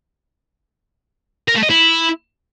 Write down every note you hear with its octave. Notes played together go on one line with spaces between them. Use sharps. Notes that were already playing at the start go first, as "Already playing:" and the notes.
A#4
A3
D#5
E4